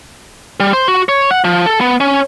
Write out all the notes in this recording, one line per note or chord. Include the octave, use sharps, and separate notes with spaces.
G3
C5
F#4
C#5
F#5
F3
A4
B3
C#4